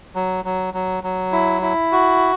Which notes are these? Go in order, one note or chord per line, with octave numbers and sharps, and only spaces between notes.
F#3
F#3
F#3
F#3
E4
E4
F#4